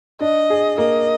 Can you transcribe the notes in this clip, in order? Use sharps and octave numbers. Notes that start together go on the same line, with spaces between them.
D4 D#5
G#4
A#3 D#5